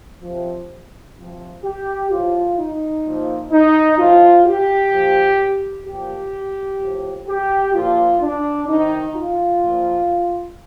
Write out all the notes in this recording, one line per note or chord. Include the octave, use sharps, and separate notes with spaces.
F3
C3
C3 F3
G4
A2 F3 F4
D#4
A#2 F3
D#4
A2 F3 F4
G4
A#2 F3
A#2 F3 G4
A2 F3
G4
A#2 F3 F4
D4
C3 D#3 D#4
F4
A#2 F3